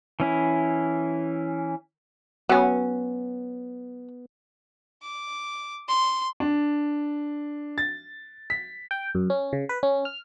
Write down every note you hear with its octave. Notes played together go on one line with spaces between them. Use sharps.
E3 C#4 E4
F#3 B3 C#4
D6
C6
D4
A6
B6
G5
F#2
C#4
C#3
B4
C#4
F6